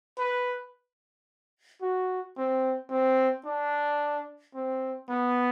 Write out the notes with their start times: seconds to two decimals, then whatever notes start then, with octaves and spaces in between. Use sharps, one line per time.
0.18 B4
1.82 F#4
2.37 C4
2.90 C4
3.45 D4
4.55 C4
5.09 B3